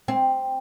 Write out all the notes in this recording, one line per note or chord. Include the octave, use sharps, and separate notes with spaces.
C4